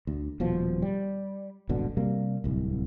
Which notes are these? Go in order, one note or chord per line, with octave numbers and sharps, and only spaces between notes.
D2
D#1 B2 F3
G3
D#1 G#1 B2 D3
C3 G3 A#3
D1 C2